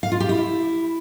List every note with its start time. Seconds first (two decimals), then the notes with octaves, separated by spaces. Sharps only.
0.03 F5
0.12 F4
0.20 G4
0.29 E4